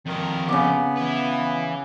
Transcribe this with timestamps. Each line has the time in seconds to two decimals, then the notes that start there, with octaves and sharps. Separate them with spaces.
0.06 F2 D#3 A#4
0.49 C#3 B3 D6
0.97 E4 B4